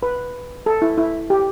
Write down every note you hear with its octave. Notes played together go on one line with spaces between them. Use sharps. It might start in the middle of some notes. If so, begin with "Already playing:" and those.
B4
A4
E4
E4
G4